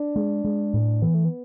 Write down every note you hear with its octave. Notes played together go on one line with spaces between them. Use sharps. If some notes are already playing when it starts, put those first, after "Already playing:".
Already playing: D4
G#3
G#3
A2
E3 B3
A3
B3